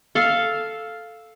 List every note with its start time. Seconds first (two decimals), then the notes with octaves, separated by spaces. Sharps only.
0.15 A4 F5